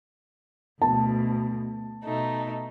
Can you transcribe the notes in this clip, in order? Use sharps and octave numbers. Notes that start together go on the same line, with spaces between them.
D2 B2 A5
B2 A3 D#4